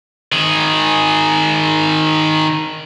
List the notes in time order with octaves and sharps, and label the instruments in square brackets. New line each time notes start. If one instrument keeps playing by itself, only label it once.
[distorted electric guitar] D#3 G#4